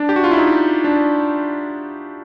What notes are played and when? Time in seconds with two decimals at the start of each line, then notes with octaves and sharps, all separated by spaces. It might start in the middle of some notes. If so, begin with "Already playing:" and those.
Already playing: D4
0.09 G4
0.16 F#4
0.24 F4
0.31 E4
0.38 D#4
0.84 D4